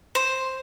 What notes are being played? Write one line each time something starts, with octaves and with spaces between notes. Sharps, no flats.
C5